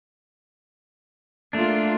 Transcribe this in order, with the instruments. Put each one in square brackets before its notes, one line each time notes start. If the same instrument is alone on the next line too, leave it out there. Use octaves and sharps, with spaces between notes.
[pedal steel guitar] A3 D4 [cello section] A#3 F4